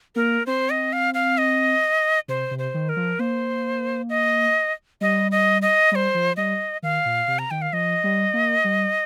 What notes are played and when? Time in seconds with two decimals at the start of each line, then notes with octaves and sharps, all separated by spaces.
0.16 A#3 A#4
0.46 C4 C5
0.70 D#5
0.93 F5
1.14 F5
1.38 D#5
2.28 C3 C5
2.51 C3
2.59 C5
2.74 D#3
2.89 A#4
2.97 F3
3.19 A#3 C5
4.10 D#5
5.01 G3 D#5
5.32 D#5
5.62 D#5
5.92 G3 D#5
5.95 C5
6.14 F3
6.37 G3 D#5
6.83 D#3 F5
7.05 A#2
7.28 C3
7.39 A#5
7.51 D#3 G5
7.62 F5
7.73 F3 D#5
8.04 G3
8.34 A#3
8.64 G3